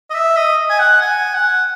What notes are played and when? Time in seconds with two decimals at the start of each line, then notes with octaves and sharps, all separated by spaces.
0.10 D#5
0.14 E5
0.36 D#5
0.69 G#5
0.79 F#5
1.02 G#5
1.34 F#5